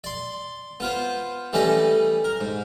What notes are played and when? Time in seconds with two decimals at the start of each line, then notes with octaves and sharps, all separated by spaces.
0.04 D5 C6
0.80 B3 F4 C5
1.53 E3 G3 A3 C#4 D5 D#5
2.24 A#4
2.40 G#2